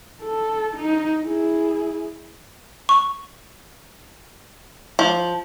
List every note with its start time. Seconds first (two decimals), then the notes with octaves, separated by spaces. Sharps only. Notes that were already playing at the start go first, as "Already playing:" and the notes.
0.23 A4
0.76 D#4
1.22 E4 G#4
2.89 C#6
4.99 F3